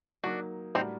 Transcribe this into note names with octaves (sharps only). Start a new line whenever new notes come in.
F#3 A#3 D4 D#4 F#4
A2 G3 C4 D4 D#4 F#4 A#4